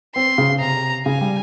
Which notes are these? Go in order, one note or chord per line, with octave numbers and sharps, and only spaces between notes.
C4 C6
C#3
C3 A#5
C#3 G#5
G3